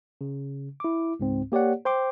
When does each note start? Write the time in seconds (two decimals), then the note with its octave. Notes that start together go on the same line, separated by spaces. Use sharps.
0.21 C#3
0.80 E4 D6
1.20 C#2 G#2 C4
1.52 A#3 G4 C#5 D5 F#5
1.85 C5 G5 C6 D6